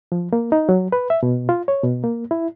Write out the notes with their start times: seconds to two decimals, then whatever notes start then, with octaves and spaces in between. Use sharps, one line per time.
0.12 F3
0.33 A#3
0.52 D#4
0.69 F#3
0.92 B4
1.10 E5
1.23 B2
1.49 F4
1.68 C#5
1.83 B2
2.03 A#3
2.31 E4